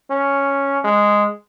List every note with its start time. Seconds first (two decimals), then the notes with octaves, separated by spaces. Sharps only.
0.11 C#4
0.84 G#3